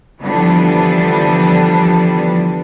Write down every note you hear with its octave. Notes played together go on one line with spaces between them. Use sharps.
D3 E3 F3 G3 B3 D4